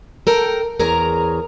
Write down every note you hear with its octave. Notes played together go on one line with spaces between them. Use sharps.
A4 A#4 G5
E2 G#4 A#4 C#5 A#5